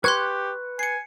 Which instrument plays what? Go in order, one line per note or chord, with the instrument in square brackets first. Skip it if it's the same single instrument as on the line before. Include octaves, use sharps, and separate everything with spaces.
[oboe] G4 [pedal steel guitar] B4 C#6 [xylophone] C6 F#6 G#6
[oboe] G#5 [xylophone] C7 C#7